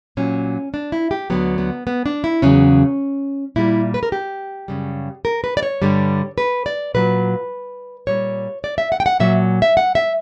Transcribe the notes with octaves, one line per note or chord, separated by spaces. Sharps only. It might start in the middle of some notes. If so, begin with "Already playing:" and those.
A#2 F#3 C#4
D4
E4
G4
D2 D3 F#3 B3
B3
B3
D4
E4
E2 C#3 F#3 C#4
A#2 G3 E4
B4
A#4
G4
F#2 C#3 G3
A#4
B4
D5
C#5
G2 D3 G3
B4
D5
A#2 F#3 B4
A#2 G3 C#5
D5
E5
F#5
G5
F#5
A#2 F#3 E5
E5
F#5
E5